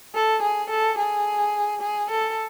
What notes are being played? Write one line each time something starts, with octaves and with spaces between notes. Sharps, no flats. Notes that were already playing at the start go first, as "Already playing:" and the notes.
A4
G#4
A4
G#4
G#4
A4